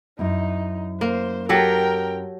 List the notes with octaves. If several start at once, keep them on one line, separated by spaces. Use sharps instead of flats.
F#2 D#4 E4
A#3 C5
F#3 G4 A4 A#4 G5